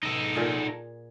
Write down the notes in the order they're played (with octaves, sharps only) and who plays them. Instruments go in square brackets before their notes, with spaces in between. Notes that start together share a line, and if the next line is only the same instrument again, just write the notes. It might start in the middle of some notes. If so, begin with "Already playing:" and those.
[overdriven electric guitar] D#4 A4
[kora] A#2 F4 G#4